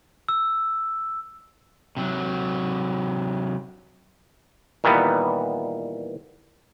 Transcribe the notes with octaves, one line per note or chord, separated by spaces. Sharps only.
E6
C3 F#3
A#2 D#3 E3 G3 B3